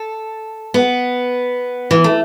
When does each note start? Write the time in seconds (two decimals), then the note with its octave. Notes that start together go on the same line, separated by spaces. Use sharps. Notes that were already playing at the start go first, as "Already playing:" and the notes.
Already playing: A4
0.74 B3
1.91 E3
2.04 A3